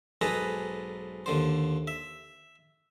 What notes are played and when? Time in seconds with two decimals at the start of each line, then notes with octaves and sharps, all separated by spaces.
0.21 B1 G#2 G#4 A4 B4 A#5
1.26 D#2 D3 C5
1.87 E5